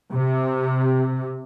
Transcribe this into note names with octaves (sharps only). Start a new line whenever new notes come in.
C3